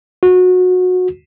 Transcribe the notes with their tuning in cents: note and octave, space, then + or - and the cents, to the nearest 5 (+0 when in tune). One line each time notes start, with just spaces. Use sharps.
F#4 -20